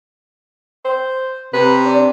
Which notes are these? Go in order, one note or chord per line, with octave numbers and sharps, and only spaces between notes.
C5
C3 B4
D4